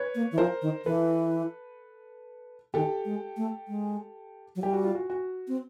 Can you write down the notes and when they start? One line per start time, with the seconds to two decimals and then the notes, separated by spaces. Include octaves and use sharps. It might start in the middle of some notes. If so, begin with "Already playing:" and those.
Already playing: B4 C#5
0.15 A#3
0.32 E3
0.38 F3 A#4 C5
0.62 D#3
0.85 E3 A4 B4
2.74 D#3 G4 A4
3.05 G#3
3.37 A3
3.68 G#3
4.56 F#3
4.62 G3 G4
4.73 F#4
4.84 F4
4.95 F#4
5.10 F#4
5.48 C4